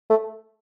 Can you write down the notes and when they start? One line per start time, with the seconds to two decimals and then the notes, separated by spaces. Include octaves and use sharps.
0.10 A3